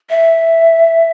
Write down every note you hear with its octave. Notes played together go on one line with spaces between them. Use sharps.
E5